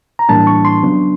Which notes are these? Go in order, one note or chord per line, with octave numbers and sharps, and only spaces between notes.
A#5
A2 E3 G3 A#3 D4 A5
C#6
C6
C#3 F#3 B3 D4